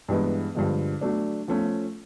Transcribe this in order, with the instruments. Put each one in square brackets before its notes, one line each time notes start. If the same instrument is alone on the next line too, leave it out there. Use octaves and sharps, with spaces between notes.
[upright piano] G2 E3 G#3 B3
G2 D3 F3 G#3
F#3 A3 D4
F3 A3 C#4